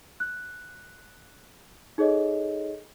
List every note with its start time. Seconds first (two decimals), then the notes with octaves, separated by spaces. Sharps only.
0.20 F#6
1.98 D#4 G#4 A4 C#5 D#5